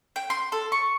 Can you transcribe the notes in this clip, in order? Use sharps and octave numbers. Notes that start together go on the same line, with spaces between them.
G5
C6
A4
C#6